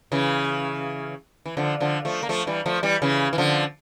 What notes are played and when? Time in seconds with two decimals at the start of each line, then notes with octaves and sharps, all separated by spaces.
0.12 C#3 E3
1.46 E3
1.57 D3 F3
1.80 D3 F3
2.05 F3 A3
2.23 A#3
2.29 F3 A3
2.47 E3 G3
2.66 F3 A3
2.83 E3 G3
3.02 C#3 E3
3.33 E3
3.38 D3 F3